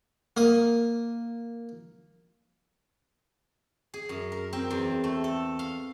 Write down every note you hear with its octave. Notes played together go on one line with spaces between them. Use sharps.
A#3 D#6
G#4
F#2
A#4
C4
E2
A3
A4
F5